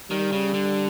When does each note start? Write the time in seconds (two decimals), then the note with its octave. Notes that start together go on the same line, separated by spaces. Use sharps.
0.11 D#3 G3
0.32 C#3
0.54 D3